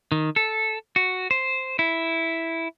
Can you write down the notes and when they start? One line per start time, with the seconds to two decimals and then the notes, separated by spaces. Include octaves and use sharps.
0.12 D#3
0.36 A4
0.96 F#4
1.31 C5
1.79 E4